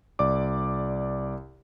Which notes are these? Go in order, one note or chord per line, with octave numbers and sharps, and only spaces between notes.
C2 D5 D6